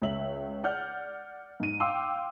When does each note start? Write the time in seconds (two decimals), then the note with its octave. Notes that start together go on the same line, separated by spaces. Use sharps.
0.02 C#2 C#5 E5 F#7
0.64 D5 F#5 F6 G6
1.60 G#2 D#7
1.80 F5 G5 C6 D6 E6